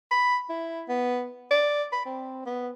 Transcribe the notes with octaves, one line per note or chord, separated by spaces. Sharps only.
B5
E4
B3
D5
B5
C4
B3